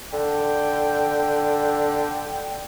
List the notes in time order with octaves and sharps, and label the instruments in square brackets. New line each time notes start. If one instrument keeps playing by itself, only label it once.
[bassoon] D3 [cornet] G5